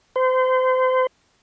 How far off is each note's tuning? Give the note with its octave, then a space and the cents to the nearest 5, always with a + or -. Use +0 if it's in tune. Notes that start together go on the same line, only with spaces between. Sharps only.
C5 -30